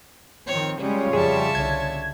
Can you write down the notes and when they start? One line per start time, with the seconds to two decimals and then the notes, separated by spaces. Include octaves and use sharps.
0.47 D#3 F3 C4 C#5
0.80 C#3 G3 G#3 C#4 F4 C#5
1.13 F2 G3 G#4 E5 A5
1.55 C2 D3 G#6